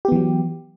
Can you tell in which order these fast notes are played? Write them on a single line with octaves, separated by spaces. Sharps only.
G4 B3 E3 F#3